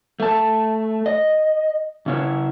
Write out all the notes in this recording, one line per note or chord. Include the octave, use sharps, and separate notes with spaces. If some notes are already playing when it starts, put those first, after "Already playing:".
A3 A5
D#5
C#3 C#4 E4